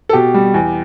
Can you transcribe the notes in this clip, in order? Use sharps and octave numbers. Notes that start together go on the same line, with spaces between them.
A4
B2 G4
G3
E2